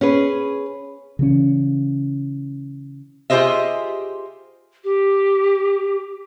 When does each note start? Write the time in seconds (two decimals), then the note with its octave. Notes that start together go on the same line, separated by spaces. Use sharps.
0.01 C#4 G#4 B4
1.19 C#3 E3 C#4
3.30 F4 G4 G#4 C5 D#5 E5
4.84 G4